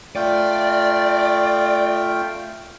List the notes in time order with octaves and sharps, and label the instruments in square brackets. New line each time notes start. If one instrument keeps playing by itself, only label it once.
[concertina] A3 F4 G5 [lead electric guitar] D5